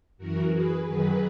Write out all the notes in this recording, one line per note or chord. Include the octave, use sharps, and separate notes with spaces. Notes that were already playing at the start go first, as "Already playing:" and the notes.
F#2 E3 F#4 A#4
G#4 B4
F#2 D#3 F#3 G#4 B4